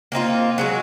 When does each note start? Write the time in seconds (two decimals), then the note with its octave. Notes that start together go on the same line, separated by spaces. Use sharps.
0.12 A#3 C4 D#4 F4
0.58 F#3 G#3 F#4